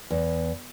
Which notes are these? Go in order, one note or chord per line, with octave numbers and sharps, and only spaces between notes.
E2